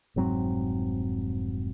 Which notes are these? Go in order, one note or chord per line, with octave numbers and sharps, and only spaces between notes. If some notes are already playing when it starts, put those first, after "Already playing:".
F1 G#2 F#3 C4